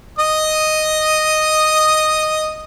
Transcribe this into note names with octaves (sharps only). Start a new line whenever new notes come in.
D#5 D#6